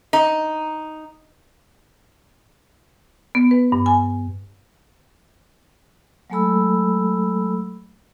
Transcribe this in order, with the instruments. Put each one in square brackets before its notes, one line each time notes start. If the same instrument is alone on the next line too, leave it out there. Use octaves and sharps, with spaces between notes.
[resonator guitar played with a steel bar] D#4
[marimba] B3
B4
G2
G#5
[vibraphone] F#3 G#3 A3 A4 B5 E6